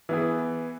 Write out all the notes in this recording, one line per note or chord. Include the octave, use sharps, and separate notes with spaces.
E3 B3 E4 G#4